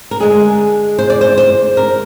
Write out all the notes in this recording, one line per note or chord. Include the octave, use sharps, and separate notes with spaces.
A#4
D3 G#3 G#4
C5
D5
C5
C5
A#4